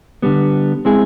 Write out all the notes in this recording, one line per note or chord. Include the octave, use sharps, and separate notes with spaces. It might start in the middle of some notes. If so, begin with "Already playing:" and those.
D3 G3 B3
G#3 C4 E4 G#4